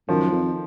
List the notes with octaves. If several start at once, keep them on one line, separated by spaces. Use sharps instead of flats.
F#2 D#3 F3
F2